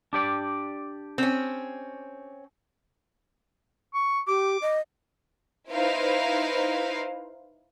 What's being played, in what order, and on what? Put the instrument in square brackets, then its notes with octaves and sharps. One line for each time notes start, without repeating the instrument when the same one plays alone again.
[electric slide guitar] D4 G4 D5
[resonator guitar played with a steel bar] C4 C#4
[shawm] C#6
[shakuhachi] G4 [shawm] D6
[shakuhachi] D#5
[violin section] D#4 E4 B4 C5 F5